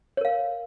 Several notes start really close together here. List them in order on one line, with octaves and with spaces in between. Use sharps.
C#5 A#4 F5